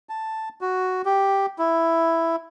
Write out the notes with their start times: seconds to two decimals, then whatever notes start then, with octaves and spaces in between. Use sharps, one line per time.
0.09 A5
0.61 F#4
1.05 G4
1.59 E4